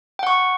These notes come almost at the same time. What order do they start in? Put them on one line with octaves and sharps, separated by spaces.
G5 F#5 C#6